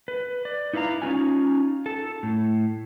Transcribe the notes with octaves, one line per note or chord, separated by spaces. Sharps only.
B4
D5
D#4 E4 B4 F5 A#5
C#4 D#4 F4 G#5
A4 A5
A2